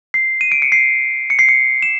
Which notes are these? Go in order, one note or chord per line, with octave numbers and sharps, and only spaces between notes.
C7
D#7
D7
C#7
C7
C#7
C7
C#7
E7